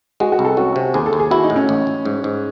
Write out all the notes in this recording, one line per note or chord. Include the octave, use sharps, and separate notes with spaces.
G#3 F#4
F#4
C2
A4
C#4 F#4
C3
D#2 G#4
A4
D#2
G#4
E4 F#4
D#4
A2
C#4
A1
A1
G#2
G#2